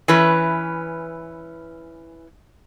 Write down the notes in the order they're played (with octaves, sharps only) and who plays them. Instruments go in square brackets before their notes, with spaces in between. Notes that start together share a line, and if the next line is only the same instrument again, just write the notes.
[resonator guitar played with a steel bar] E3 C#4 B4